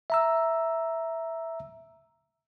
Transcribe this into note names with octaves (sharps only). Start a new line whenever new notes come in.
E5 A#5 E6